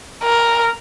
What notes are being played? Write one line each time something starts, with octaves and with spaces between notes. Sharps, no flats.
A#4